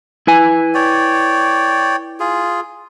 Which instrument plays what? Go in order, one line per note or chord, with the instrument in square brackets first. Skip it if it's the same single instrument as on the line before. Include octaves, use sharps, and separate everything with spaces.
[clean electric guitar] E4 B4 G#5
[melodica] C#5 D5 G5
F4 G#4